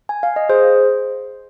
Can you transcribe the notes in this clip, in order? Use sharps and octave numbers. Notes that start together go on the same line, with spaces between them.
G#5
F5
D#5
G#4 C5